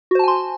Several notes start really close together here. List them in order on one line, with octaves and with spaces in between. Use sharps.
F#4 C5 A5 G#5 C6